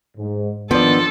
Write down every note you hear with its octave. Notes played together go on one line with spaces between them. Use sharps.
G#2
D#3 F3 B3 D4 A4 D5